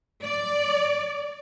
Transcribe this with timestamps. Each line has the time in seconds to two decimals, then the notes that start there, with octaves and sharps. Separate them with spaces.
0.22 D5